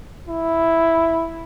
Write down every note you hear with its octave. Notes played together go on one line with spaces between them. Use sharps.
E4